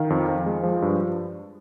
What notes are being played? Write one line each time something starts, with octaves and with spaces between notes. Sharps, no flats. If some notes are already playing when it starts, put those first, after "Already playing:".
Already playing: D#3 F5
F2
F2
G#3
F3
G2